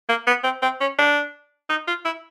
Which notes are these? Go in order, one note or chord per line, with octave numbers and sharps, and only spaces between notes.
A#3
B3
C4
C4
C#4
D4
D#4
F4
E4